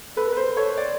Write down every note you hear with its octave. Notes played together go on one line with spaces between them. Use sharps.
A4 B4
A#4 B4
A4 C5
A4 C#5
D5